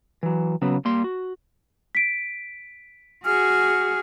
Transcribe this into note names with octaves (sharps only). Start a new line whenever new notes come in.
E3 F#3
C#3 F#3 B3
G3 A#3 C6
F#4
B6 D7
F#4 G#4 F6